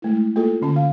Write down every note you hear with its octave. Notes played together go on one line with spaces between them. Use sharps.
G#3 A3 E4
A#3 F4 A4
D3 C#4 A5
F5